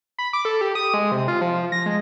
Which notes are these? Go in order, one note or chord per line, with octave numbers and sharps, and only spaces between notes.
B5
D6
A4
G4
D#6
G#3
C3
F4
F3
A#6
G#3